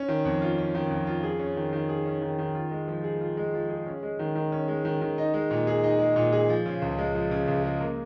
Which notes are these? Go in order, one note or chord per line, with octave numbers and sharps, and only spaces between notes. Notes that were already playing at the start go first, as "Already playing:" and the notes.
Already playing: C#4
D#3
F2
F4
C#4
D#3
F2
F4
G#4
C#4
D#3
D#3
G#4
C#4
D#3
D#3
F4
G#3
F3
G#4
F4
G#3
F3
G#4
C#4
G#3
D#3
D#3
C#4
G#3
D#3
D#3
D#4
G#3
A#2
G#4
D#4
G#3
A#2
G#4
F3
C#3
C#2
G#3
F3
C#3
C#2
G#3
A#3